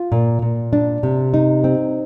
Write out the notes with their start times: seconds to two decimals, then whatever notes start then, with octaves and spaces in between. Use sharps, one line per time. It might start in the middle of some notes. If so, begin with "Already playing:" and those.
Already playing: F4
0.12 A#2
0.42 A#2
0.73 D4
1.03 C3
1.34 D#4
1.64 C4